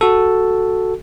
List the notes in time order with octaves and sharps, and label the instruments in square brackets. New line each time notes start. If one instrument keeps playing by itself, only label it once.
[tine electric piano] F#4 A4